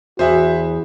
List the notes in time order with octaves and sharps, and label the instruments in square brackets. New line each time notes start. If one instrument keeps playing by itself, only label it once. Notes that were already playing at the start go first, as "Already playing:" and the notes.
[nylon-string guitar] E2 [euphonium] F#4 [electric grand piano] C5 E5 F#5